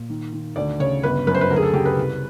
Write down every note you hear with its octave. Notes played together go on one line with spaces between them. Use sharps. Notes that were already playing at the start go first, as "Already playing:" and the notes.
Already playing: A#2
D#3
D#3
D2 D5
C#3 C#5
G1 B4
F#2 B4
C5
B4
D2 A#4
G#4
A4
C#3 G4
B4
C2